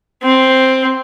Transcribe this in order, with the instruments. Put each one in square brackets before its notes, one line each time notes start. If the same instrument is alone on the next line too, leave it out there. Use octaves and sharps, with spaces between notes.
[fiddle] C4